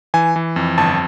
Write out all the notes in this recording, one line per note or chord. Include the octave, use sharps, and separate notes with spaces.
E3 G#5
E3
F2
G1 A5